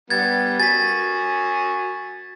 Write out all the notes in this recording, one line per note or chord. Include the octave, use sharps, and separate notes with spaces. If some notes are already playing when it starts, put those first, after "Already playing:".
G3 B3 G#6 A6
F#4 G#5 A6 B6